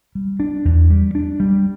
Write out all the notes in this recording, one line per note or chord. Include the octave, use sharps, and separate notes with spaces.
G3
D4
E2
G3
D4
G3